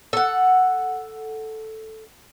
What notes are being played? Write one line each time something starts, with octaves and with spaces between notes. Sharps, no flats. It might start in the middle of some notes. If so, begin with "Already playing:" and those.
A4 F#5